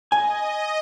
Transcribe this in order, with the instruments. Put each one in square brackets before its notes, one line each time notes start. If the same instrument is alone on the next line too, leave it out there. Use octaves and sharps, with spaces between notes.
[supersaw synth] D#5 [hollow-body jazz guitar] G#5